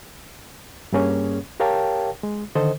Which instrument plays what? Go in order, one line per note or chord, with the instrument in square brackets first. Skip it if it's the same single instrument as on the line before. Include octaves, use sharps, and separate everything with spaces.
[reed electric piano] G2 G3 A#3 C#4 G#4 C#5
G4 A#4 C#5 F5 G5 A5
G#3
D3 D#3 A4 C5 D#5